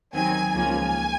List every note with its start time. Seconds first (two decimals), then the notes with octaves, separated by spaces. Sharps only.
0.14 D#2 D#3 F#3 C4 G#5
0.54 C#2 C#3 F3 A#3 G#5